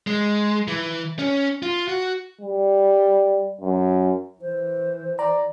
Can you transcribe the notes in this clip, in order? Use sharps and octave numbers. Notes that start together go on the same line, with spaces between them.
G#3
E3
C#4
F4
F#4
G3
F#2
E3 C5
D5 A#5